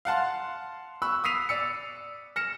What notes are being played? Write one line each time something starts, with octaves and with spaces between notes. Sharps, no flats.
F5 F#5 A5 C6
B5 C#6 E6 F#6
D#6 E6 B6 C7 D#7 F7
D5 E6 C#7
F6 A#6 C#7 E7